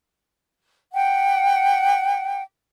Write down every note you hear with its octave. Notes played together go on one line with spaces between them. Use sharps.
F#5 G5